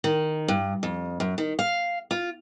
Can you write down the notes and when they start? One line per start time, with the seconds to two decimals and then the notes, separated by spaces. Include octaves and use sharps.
0.04 D#3
0.48 G2
0.83 F2
1.20 F#2
1.38 D#3
1.59 F5
2.11 F4